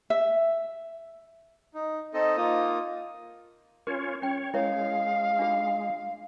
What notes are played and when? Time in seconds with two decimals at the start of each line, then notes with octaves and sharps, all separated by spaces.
0.10 E5
1.74 D#4
2.14 C4 D#4 A4 D#5
2.37 A#3 D#4 F4 D#6
3.87 C#4 F4 A#4 C#5
4.22 C#4 C#5 G5
4.54 G#3 E4 A#4 C#5 F5
5.39 D4 F4 G#4